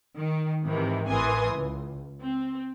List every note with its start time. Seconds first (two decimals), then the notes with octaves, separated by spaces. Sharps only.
0.17 D#3
0.63 G#2 C3 D#3 E3
1.07 A1 E3 A#4 G#5 C6 D#6
1.51 C#2
2.20 C4